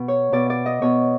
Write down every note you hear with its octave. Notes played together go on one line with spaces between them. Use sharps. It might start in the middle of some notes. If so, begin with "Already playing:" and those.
Already playing: B2
C#5
B2 D5
D5
D#5
B2 C#5